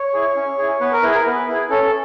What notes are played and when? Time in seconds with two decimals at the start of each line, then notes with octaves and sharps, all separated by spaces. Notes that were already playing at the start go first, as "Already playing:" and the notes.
Already playing: C#5
0.14 E4 G#4
0.36 C#4
0.58 E4 G#4
0.81 B3 B4
0.93 A#4
1.03 E4 G#4 B4
1.15 A#4
1.26 B3 B4
1.48 E4 G#4
1.70 C#4 A4